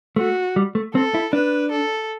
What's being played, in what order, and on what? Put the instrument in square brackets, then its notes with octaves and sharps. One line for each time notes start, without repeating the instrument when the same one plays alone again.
[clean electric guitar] A3 [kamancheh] F#4
[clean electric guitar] G3
A3
[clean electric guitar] C4 [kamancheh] A4
[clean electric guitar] E4
[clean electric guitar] D4 [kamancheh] B4
[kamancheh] A4